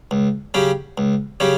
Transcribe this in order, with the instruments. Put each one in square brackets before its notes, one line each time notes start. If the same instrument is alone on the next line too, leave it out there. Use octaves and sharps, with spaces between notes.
[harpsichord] C#2
C#3 F#3 C#4 G4
C#2
C#3 F#3 C#4 G4